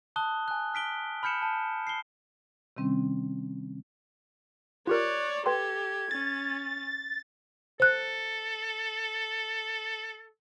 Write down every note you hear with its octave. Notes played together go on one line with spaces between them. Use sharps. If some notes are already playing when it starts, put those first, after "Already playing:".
A5 D#6 F#6 G7
G#5 F#6
F6 B6 D7 G7
B5 F6 G6 C#7 E7
A5
C7 G7
C3 D#3 G3 C4 C#4
F4 G4 A#4 C#5 D5 F#6
G4 A4 B4 G5 C6 G#6
C#4 A6
A4 C5 F#6